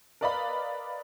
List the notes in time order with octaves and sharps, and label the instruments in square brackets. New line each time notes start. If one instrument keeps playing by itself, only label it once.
[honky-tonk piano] A#4 B4 D5 D#5 F5 B5